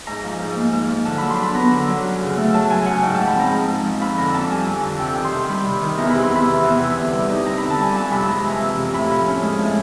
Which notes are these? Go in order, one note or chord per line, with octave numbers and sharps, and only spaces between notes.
G#2 A#5
F3
G#2
A#3
G#2
F3
D3 A5
F#3 B5
C6
D4 B5
B3 A#5
D3
F#3
F#2
C#3
A3
F#3 A5
F#2 G#5
C#3 F#5
G#2 G5
F3 A5
B5
C4 A#5
G#3
G#2
F3
F2 B5
D3 A#5
F2 A5
G3 G#5
F2
D3
C3 G5
D#3
C6
C3
G3 B5
C3
D#3
E2 A#5
C3 B5
C6
E2 B5
E3
E2
C3
D3
G3
D#4
C4 A#5
D3 B5
A5
G3 G#5
F2 A5
C3 B5
G#3 A#5
E3 A#5
F2
C3
A2 B5
F3
C#4
G#3
A2